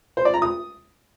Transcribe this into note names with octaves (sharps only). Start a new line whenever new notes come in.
C5
D5
A#5
D#6